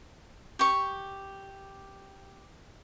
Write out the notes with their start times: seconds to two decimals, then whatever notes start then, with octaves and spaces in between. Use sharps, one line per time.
0.59 G4 C#6